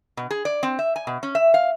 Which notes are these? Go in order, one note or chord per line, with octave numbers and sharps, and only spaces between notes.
B2
G#4
D5
C4
E5
G#5
B2
C#4
E5
F5